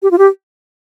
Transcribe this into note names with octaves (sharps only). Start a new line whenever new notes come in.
G4
F4
G4